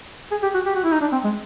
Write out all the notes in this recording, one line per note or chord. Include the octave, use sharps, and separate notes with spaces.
G#4
G4
F#4
G4
F#4
E4
D#4
D4
C4
G#3